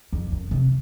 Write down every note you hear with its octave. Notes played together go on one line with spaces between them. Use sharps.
F2
F#2
C3